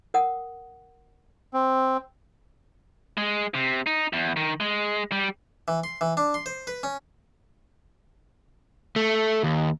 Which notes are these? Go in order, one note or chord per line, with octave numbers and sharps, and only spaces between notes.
A#4 F#5 D#6
C4
G#3
C3
D#4
E2
D#3
G#3
G3
E3
C6
E3
D4
C6
C5
B4
C#4
A3
D#2